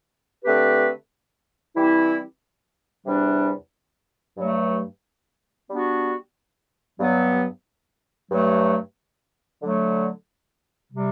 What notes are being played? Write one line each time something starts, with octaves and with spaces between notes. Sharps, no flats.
D3 A3 C4 G4 B4
E3 G3 C4 E4 G4
E2 C3 G3 D4
G2 F#3 A3
G3 B3 D4 F#4
G2 F#3 B3
G2 F#3 A3
D3 F#3 A3
C3 G3